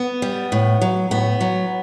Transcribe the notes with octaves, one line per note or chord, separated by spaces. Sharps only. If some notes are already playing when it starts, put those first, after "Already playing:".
Already playing: B3
G3
A2
F#3
A2 B3
F#3